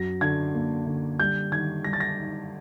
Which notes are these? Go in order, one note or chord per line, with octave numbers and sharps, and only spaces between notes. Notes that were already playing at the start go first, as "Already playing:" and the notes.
Already playing: F#2 F#3 A#6
D3 G#6
A#3
D3
G3 G6
D#3 G#6
G3 A#6
A6
A#6
D#4